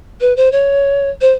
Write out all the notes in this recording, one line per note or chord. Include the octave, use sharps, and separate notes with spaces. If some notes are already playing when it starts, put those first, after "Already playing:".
B4
C5
C#5
C5